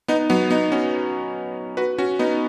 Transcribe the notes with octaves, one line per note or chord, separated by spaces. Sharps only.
B3 D#4
F#3 B3
B3 D#4
C#4 F#4
F#4 B4
C#4 F#4
B3 D#4